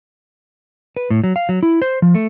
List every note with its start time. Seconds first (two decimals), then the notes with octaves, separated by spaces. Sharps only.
0.97 B4
1.10 A2
1.24 F#3
1.36 F5
1.49 F#3
1.63 E4
1.82 C5
2.02 F3
2.14 A3